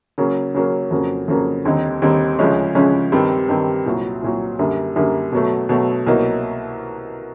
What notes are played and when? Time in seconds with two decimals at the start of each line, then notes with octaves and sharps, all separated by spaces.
0.18 C#3 F#3 A#3 C#4
0.55 C#3 F#3 A#3 C#4
0.91 F2 C#3 F#3 A#3
1.28 F2 C#3 F#3 A#3
1.65 D#2 D3 G3 C4 D#4
2.02 D#2 D3 G3 C4 D#4
2.39 D2 C#3 F3 G#3 C#4
2.75 D2 C#3 F3 G#3 C#4
3.12 G2 D#3 G3 C4
3.49 G2 D#3 G3 C4
3.86 C2 A#2 F#3
4.22 C2 A#2 F#3
4.59 F#2 D3 G3 A#3
4.96 F#2 D3 G3 A#3
5.32 B2 F#3 A3
5.69 B2 F#3 A3
6.06 C2 B2 F#3 A#3 D#4